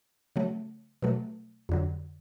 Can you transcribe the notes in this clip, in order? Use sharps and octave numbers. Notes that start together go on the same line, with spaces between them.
C#3 F#3 A3
B2 F#3 A3
F2 D3 F#3